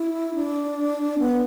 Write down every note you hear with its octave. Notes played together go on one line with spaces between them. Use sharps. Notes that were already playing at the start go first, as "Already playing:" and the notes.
Already playing: E4
D4
B3